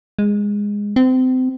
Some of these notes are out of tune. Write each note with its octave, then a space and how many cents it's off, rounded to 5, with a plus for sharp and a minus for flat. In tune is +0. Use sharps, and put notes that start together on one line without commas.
G#3 -15
C4 -30